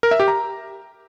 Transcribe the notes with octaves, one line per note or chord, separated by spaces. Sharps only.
A#4
E5
G4
A#5